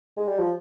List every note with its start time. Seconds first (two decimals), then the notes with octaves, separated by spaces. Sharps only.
0.17 G#3
0.28 G3
0.39 F3